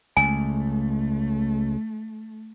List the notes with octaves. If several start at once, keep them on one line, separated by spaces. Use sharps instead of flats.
C#2 A3 G#5